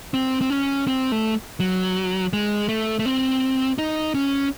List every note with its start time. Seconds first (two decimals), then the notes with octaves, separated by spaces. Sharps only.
0.14 C4
0.41 C4
0.50 C#4
0.87 C4
1.12 A3
1.60 F#3
2.33 G#3
2.69 A3
2.99 A3
3.05 C4
3.78 D#4
4.15 C#4